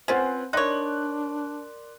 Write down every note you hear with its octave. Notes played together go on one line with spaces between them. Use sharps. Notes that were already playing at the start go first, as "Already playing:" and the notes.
C4 C#4 F4 B4 C5 F#5 G#5
D4 D#4 A#4 C#5 D5 C6 F#6